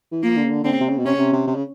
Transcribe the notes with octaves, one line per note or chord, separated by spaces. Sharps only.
E3
F3 A#3
D3
C#3
D3
D3 C4
C#3
C3
C#3
B2
C3 C#4
C#3
C3
C3
C3
C#3